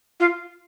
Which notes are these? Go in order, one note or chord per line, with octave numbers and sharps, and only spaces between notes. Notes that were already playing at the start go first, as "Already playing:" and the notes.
F4